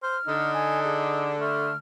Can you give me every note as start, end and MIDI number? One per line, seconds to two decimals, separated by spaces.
0.03 0.17 72
0.03 0.51 89
0.27 1.71 50
0.27 1.30 63
0.54 0.80 80
0.84 1.40 68
1.40 1.72 57
1.40 1.77 89